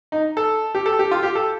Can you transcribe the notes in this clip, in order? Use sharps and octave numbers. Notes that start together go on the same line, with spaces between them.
D#4
A4
G4
A4
G4
F4
G4
A4